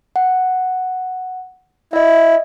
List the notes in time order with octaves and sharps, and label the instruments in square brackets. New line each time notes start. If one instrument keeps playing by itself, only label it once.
[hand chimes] F#5
[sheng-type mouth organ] E4 [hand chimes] D#5 E5